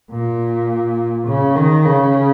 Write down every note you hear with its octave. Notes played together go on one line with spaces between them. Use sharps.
A#2
C#3
D#3
C#3